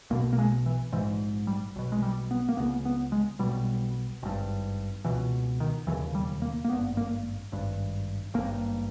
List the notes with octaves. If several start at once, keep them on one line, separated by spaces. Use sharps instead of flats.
B1 B2 A#3
A#3
G#3
E3
A#1 G#2 E3
G3
B1 B2
G#3
G3
B3
A#3
C#2 C#3 B3
B3
G#3
B1 B2 G3
G#1 G2
C#2 B2 E3
D#3
E1 D#2 C#3 E3
G3
A#3
A#3
G#1 G2 B3
A#3
G#1 G2
G#1 G2 A#3